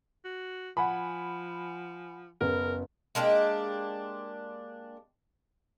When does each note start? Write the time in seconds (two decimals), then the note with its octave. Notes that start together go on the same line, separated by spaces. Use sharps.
0.24 F#4
0.77 F3 F#5 G#5 B5
2.41 F#1 B3 C#4 A#4
3.15 G#3 A#3 D4 G4